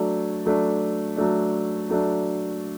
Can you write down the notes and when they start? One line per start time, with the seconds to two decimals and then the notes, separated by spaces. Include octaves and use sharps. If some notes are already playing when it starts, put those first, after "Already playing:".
Already playing: F#3 A3 D4
0.45 F#3 A3 D4
1.17 F#3 A3 D4
1.89 F#3 A3 D4